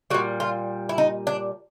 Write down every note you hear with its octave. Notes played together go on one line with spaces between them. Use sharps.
A#2 G3 F#4
F4
E4
D#4
D4